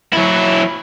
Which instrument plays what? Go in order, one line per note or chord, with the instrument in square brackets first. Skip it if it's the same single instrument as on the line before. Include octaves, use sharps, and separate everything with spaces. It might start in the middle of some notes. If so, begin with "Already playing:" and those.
[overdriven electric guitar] F#3 E4